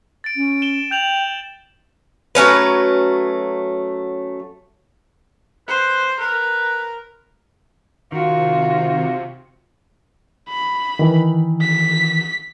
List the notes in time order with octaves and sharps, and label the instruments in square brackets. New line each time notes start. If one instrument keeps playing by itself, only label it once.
[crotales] A6 D7
[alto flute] C#4
[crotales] D7 E7 G7
[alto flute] G5 [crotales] G6 F7 F#7
[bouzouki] F#3 A3 C#4 B4
[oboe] B4 [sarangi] C5
[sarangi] A#4 [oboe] B4
[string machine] C3 [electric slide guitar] D#3 [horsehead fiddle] F4 F#4
[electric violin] B5
[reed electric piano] D#3 E3
[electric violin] B6